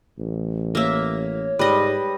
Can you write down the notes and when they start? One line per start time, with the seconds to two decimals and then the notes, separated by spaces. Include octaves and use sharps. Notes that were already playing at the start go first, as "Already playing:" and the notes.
0.19 A1
0.75 A#3 C#5 E5
1.59 G#2 G3 B4 D#5